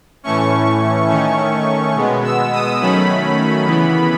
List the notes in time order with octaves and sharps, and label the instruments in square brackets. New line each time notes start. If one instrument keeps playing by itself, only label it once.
[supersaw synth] A2 E3 A3 C#4 C#6
D#3 A3 C#4
B2 G#3 B3
E6
D#6
D#3 F#3 A3 C#4 B5
C#3 E3 B3